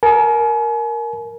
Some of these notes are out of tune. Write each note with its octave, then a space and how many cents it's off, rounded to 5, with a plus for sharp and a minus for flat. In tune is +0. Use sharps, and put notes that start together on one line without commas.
A#4 +0 G#5 +40